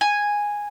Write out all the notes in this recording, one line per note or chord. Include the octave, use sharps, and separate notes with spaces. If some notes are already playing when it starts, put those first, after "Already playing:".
G#5